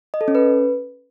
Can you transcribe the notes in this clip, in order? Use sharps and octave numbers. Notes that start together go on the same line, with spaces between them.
D#5
A4
C#4
B4